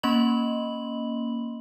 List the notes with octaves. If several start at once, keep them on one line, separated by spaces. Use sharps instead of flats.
A#3 C#4 D#5 B5 C6 F#7